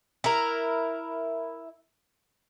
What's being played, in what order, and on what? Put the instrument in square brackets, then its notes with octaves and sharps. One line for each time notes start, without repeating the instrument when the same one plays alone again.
[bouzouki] E4 A#4